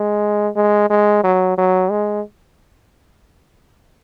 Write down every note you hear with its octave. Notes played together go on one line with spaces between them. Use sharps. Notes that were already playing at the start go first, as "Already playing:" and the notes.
Already playing: G#3
G#3
G#3
F#3
F#3
G#3